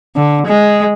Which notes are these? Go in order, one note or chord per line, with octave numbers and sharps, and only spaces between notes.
D3
G#3